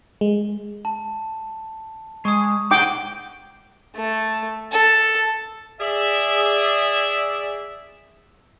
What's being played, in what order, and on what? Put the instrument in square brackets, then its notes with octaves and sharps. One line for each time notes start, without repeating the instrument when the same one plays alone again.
[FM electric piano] G#3
[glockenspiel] A5
[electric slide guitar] G#3 [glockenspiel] C#6 D#6
[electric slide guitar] D#4 G#4 F#5 [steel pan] G5 D6
[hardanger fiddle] A3
A4
[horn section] G#4 D5 E5